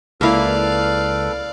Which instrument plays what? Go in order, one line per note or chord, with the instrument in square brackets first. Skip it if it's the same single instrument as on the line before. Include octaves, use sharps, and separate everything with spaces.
[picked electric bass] C#2 [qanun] A#3 E4 [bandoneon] A4 B4 F6 [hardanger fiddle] D5 F5